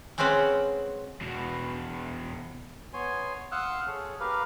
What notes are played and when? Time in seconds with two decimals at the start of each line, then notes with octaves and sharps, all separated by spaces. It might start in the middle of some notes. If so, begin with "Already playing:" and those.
0.18 G#3 C4 C#4 B4 C5 F#5
1.21 E2 B2
2.94 B3 C#5 G#5 C6
3.52 F5 F#5 C6 D#6 E6 F#6
3.87 G#4 A4 C#5
4.20 G4 A#4 B4 F5